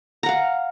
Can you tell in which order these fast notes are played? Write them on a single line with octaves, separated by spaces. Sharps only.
A#5 F#5 F5